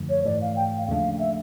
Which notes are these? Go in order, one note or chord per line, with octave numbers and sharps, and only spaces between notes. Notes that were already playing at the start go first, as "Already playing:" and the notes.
Already playing: F#2 D3 F3 A3
C#5
G#2 E3 A3 D5
F5
G5
F5
D#2 C#3 F3 A3 D4 F5
E5